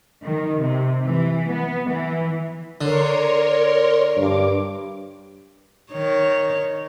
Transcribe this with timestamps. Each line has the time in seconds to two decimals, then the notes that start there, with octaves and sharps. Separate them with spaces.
0.22 D#3
0.60 C3
1.04 E3
1.51 B3
1.88 E3
2.81 D3 A#4 C#5 C6
4.17 G2 D6
5.93 D#3 C#5